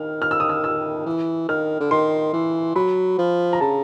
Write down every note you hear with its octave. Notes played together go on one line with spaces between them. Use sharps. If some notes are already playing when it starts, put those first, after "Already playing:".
Already playing: D#3 F6
F6
E6
D#6
E6
E6
E3
D#3 F6
D3
D#3 C6
E3
F#3 B5
F3
A#5
C#3 A5